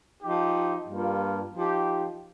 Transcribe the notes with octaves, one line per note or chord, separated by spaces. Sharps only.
F3 D#4 G4
G2 G3 A#3 F4
F3 D#4 G4